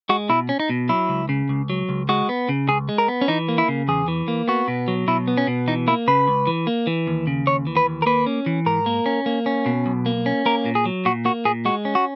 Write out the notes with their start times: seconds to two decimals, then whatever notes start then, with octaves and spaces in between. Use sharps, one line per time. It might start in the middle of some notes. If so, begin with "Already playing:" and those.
0.09 G#3 F#4
0.29 B2 E4
0.49 C#4
0.60 D#4
0.70 B2
0.89 F#3 E4
1.09 C#2
1.29 C#3
1.49 C#2
1.70 F#3
1.89 C#2
2.09 G#3 F#4
2.29 B3
2.49 C#3
2.68 C#2 G#4
2.89 G#3
2.98 A#4
3.08 B3
3.21 C#4
3.28 E3 D#4
3.49 A#3
3.58 E4
3.68 C#3
3.88 E2 G#4
4.08 E3
4.28 A#3
4.48 B3 F#4
4.68 B2
4.88 F#3
5.08 B2 E4
5.28 B3
5.37 C#4
5.47 B2
5.68 E3 D#4
5.87 A#3 E4
6.08 C#3 B4
6.28 C#2
6.47 E3
6.67 A#3
6.87 E3
7.07 D#2
7.27 C#3
7.47 D#2 C#5
7.67 E3
7.77 B4
7.86 D#2
8.02 A#4
8.06 A#3 B4
8.26 C#4
8.46 E3
8.66 G#2 A#4
8.86 A#3
9.06 C#4
9.26 A#3
9.46 C#4
9.66 B2
9.86 B1
10.06 A#3
10.26 C#4
10.46 A#3 A#4
10.66 A#2
10.75 G#4
10.85 F#3
11.05 A#2 F#4
11.25 A#3 F#4
11.45 A#2 G#4
11.65 G#3 F#4
11.85 C#4
11.95 F#4